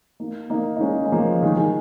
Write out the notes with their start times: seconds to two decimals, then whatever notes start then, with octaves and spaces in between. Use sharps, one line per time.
0.20 A#3 D#4
0.50 A#3 D#4
0.76 D#4
0.80 G#3 C#4
1.06 G#3
1.12 F3 A#3
1.42 D#3 G#3
1.58 D#3 G#3